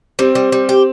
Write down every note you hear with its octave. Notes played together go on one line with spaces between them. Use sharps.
G3 C4
G3
G3
G4